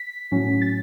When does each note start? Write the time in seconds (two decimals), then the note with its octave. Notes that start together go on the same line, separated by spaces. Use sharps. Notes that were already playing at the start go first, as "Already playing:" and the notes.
Already playing: B6
0.32 A2 F#3 C#4
0.61 A6